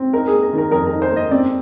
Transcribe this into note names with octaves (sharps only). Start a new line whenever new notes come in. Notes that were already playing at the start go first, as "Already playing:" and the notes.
Already playing: C4
D#4 A#4
A#3 G#4
A#4
D#3 A#4
F2 A#4
A#4
D#4
C5
A#3
D#5
C4 D5